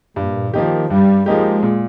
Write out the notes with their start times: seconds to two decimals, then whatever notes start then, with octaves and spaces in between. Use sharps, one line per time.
0.16 G2 A#2
0.53 D#3 F3 A#3 D#4 G4
0.89 G2 G3
1.26 F3 G#3 A#3 D#4 G4
1.63 A#2